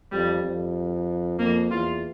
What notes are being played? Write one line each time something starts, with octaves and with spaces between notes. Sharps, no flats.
F2 G3
F2
F2 A#3
E2 F4